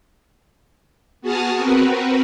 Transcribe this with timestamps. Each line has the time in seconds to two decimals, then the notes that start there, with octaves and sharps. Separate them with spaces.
1.21 B3 F#4 G#4 A5 D#6 F6
1.56 C4 F#4 A#4 B4